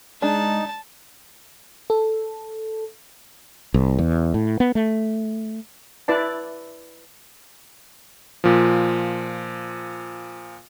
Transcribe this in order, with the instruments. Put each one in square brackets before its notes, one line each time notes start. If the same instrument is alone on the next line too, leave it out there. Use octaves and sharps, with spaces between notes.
[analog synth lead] G#3 [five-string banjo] D4 [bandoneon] D#4 [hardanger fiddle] A5
[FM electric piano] A4
[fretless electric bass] C2
E2
A2
B3
A3
[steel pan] E4 B4 D5 A5
[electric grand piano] A#2 F3